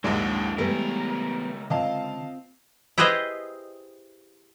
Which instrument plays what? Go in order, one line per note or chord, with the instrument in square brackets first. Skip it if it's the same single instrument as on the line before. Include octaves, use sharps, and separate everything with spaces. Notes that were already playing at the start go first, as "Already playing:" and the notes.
[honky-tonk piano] A#1 D#2 G#2 [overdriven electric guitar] D3 F#3 [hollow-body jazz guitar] G#3 D5 [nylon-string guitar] E4
[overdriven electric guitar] C#2 A#4 [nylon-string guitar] E3 B3 G#5 [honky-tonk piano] G3 A3
[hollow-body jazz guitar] D3 [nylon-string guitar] C4 F4 [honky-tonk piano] D#5 F5 A5
[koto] E4 G4 G#4 B4 C5 D#5